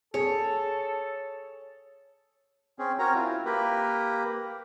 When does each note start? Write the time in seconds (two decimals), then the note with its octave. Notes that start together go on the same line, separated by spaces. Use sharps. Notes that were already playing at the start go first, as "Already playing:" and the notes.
0.14 G#4 A4 C#5
2.79 C4 C#4 G#4
2.99 C4 C#4 F#4 A#4 C#5 A#5
3.15 E4 F4
3.45 A#3 G4 A#4 B4